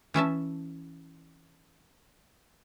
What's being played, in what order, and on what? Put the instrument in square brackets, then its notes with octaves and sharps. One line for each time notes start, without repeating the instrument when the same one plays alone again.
[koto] E3 C#4 E5 A5